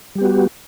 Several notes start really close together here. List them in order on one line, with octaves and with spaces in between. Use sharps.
G3 G4 B3 F#4